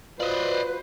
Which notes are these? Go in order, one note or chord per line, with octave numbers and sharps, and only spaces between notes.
F4 F#4 B4 C5 D5 D#5